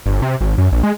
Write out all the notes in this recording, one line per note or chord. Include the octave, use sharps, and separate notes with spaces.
G1
C3
G#1
F#2
A#1
G#3